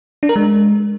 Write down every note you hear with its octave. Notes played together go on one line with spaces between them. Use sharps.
D4
A#4
G#3